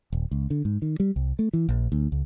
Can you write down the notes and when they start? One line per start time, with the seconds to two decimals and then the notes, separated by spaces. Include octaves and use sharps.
0.12 D#1
0.31 C#2
0.50 D3
0.65 G#2
0.82 D#3
1.00 G3
1.16 C2
1.39 A3
1.53 E3
1.69 A#1
1.92 D2
2.12 C#2